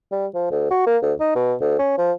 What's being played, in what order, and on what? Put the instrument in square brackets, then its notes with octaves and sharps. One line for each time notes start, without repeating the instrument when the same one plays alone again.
[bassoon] G3
F3
D2
F#4
A#3
D2
D#4
B2
D2
C#4
F3